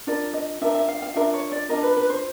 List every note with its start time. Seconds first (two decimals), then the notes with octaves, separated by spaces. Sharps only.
0.07 D4 F4 A#4 D5
0.33 D#5
0.61 D4 F4 A#4 E5
0.75 E5
0.88 F5
1.02 F5
1.15 D4 F4 A#4 E5
1.34 C#5
1.52 D5
1.69 D4 F4 A#4 D#5
1.83 B4
1.97 B4
2.10 C5